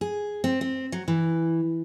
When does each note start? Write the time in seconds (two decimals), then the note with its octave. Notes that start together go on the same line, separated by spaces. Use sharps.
0.01 G#4
0.44 C4
0.61 C4
0.92 F#3
1.08 E3